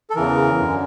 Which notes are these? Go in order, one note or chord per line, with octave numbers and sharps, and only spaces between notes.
A4
E2 C#3 E3 A#4
F#2 D3